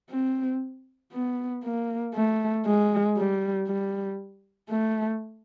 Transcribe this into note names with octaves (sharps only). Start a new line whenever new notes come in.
C4
B3
A#3
A3
G#3
G3
G3
A3